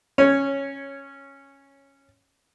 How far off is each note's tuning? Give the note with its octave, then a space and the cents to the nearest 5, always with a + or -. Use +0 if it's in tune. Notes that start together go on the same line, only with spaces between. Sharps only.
C#4 -10 C#5 +0